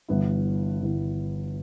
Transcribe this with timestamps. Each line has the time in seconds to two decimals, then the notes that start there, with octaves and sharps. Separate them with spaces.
0.08 G1 G2 E3 B3 E4
0.82 G1 G2 E3 B3 E4